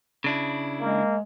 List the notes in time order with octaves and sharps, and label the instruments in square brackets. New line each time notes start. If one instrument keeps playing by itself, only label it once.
[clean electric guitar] C#3 D4 E4
[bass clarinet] G#3 [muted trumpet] A#3